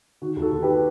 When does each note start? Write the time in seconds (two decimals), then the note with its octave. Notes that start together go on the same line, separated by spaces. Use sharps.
0.22 D#3 F#4
0.37 D#2
0.42 F#4 A4
0.52 D#2
0.63 G4 B4